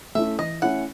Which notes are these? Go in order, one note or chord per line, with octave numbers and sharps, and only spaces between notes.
A3 C#4 E4 E5
E3 D#5
A3 C#4 E4 F#5